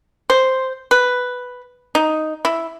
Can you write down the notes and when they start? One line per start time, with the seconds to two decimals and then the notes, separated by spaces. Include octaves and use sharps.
0.30 C5
0.91 B4
1.95 D#4
2.45 E4